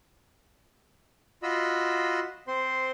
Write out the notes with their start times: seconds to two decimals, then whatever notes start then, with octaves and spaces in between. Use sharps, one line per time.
1.43 F4 F#4 D#5 B5 E6
2.48 C4 C5 C6